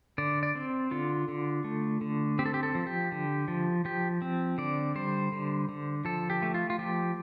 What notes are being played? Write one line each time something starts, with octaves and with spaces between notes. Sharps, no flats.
D3 D5
D5
C4
D3 F4
D3
A3
D3
C4 G4
A4
G4
A4
F3
G4
D3
F3
F3 G4
C4
D3 D5
G3 C5
D3
D3
F3 A4
G4
A3
F4
F4
F3 G4